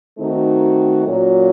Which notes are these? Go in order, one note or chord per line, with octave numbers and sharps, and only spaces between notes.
D#3 A3 C4 D#4 F#4
A#2 F#3 A#3 C#4 F#4